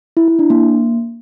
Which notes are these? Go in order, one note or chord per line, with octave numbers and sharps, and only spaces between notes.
E4
E4
D4
A#3